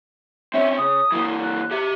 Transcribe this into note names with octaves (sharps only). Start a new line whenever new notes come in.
C4 C#4 E5
C#3 D#6
E3 A#3
F#6
G4 E5